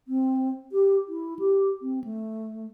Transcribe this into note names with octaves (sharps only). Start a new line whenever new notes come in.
C4
G4
E4
G4
C4
A3